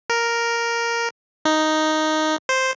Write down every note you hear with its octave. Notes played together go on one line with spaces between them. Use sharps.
A#4
D#4
C5